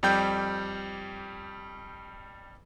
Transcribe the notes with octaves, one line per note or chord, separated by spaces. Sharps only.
F2 G3 G5 G6